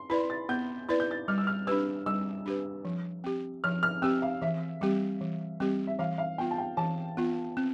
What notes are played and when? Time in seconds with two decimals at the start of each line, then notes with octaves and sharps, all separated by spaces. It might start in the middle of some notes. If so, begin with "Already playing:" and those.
Already playing: C6
0.10 E4 B4 D5 B5
0.30 A6
0.49 B3 G6
0.89 E4 B4 D5 A6
1.00 G6
1.11 A6
1.28 G3 F6
1.38 E6
1.47 F6
1.67 D4 G4 B4 E6
2.06 G3 E6
2.46 D4 G4 B4
2.85 F3
3.24 C4 G4
3.64 F3 F6
3.83 F6
4.02 C4 G4 E6
4.22 F5
4.42 E3 E5
4.81 G3 C4 G4
5.21 E3
5.60 G3 C4 G4
5.87 E5
5.99 E3 F5
6.18 F5
6.38 B3 F4 G5
6.51 A5
6.58 G5
6.77 E3 A5
7.17 B3 F4
7.57 C4